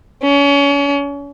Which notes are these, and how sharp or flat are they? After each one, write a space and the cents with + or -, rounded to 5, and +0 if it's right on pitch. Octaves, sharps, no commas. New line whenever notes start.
C#4 +35